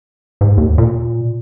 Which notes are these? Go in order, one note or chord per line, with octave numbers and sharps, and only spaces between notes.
G#2
D#2
A#2